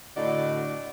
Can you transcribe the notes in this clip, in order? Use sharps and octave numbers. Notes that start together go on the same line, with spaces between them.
A2 D3 F#4 D5 D#5